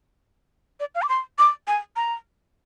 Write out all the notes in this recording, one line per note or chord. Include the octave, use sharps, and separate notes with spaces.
D5
F5
D6
C6
D6
G#5
A#5